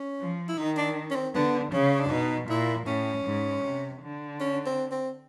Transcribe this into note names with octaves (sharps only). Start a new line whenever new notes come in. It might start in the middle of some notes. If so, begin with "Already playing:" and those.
Already playing: C#4
F3
E4
D#3 D#4
D4
C#4
C4
D3 B3
C#3 C#4
D4
B2 D#4
A#2 E4
A2 C#4
G#2
C3
D3
C#4
C4
C4